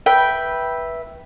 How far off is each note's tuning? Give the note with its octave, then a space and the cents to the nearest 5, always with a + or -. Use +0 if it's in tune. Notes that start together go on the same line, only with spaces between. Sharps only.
B4 -15 E5 +0 G5 -5